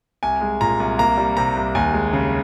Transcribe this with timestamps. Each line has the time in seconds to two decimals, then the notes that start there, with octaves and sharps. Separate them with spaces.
0.23 C2 G#5
0.41 G#3
0.61 A#2 A#5
0.80 C2
0.98 A#3 A#5
1.17 G3
1.37 C3 A#5
1.57 C2
1.75 D#2 G#5
1.94 G#3
2.13 C#3